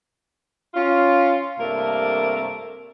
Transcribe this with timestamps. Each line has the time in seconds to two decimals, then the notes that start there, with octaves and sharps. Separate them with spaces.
0.74 C#4 F4
1.59 G2 C3 A3 A#3 A#4